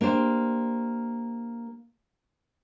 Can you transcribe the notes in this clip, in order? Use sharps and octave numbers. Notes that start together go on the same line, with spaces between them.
A#3 D4 G4 C5